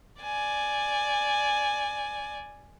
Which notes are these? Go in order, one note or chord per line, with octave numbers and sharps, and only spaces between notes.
D5 G#5